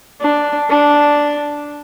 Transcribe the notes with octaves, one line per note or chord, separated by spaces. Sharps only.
D4
D4